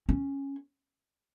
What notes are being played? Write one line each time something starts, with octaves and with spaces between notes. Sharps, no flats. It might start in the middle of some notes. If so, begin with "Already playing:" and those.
C#4